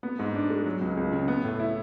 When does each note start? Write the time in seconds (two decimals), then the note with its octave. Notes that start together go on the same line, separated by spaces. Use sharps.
0.03 B3
0.19 G#2
0.34 D4
0.50 G#3
0.66 F#3
0.81 C#2
0.97 C#2
1.12 C#3
1.28 B3
1.44 A2
1.60 E4